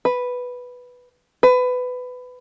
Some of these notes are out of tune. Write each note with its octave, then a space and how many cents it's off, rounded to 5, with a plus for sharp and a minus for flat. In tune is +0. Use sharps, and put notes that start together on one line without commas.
B4 +0
B4 +20